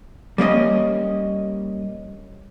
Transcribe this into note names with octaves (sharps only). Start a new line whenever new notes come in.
G3 A#3 C#4 D#5